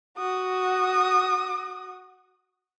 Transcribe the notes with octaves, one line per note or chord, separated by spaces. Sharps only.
F#4 D#6